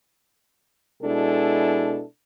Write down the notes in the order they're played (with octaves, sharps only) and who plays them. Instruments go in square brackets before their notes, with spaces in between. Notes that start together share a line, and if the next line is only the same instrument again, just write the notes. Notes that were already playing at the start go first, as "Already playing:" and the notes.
[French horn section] B2 G#3 D4 E4 A4